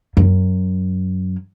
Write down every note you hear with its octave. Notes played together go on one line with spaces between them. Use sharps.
F#2